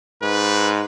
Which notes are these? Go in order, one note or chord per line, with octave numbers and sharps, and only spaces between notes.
G#2 B4